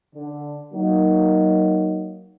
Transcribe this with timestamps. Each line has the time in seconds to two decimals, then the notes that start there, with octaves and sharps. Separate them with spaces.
0.15 D3
0.73 F#3 A#3 D#4